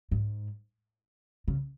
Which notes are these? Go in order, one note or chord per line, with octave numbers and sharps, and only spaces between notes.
G#2
C#3